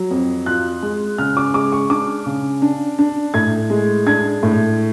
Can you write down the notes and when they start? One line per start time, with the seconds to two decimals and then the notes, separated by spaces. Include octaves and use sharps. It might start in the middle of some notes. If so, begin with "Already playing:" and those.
Already playing: F#3
0.11 F2
0.46 F4 F#6
0.82 G#3
1.18 C#3 F6
1.37 D6
1.54 G#3 D6
1.72 C#6
1.90 D4 D6
2.26 C#3
2.62 D4
2.99 D4
3.34 A2 G#6
3.70 G#3
4.06 D4 G#6
4.43 A2